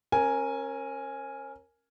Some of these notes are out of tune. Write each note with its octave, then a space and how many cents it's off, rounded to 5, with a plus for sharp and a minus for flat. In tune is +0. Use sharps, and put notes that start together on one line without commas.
C#4 -40 A#4 +0 G#5 +0